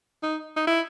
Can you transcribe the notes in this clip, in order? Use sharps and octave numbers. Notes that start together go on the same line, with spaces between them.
D#4
D#4
E4